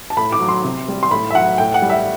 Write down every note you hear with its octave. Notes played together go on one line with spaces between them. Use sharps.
A5
A2 B5
D6
F#3
C6
C3
G3
C6
A2 B5
E5
F#3 F#5
A2 G5
F#5
G3
E5